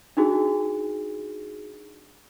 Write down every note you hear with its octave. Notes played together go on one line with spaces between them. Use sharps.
D4 D#4 F#4 G#4